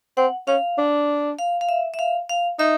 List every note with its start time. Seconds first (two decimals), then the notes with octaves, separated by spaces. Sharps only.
0.17 C4 F#5
0.47 C#4 F5
0.78 D4
1.39 F5
1.61 F5
1.69 E5
1.94 E5
1.99 F5
2.29 F5
2.59 D#4 E5